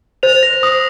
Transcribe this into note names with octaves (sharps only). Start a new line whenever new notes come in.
C5 F7
A#6
D#6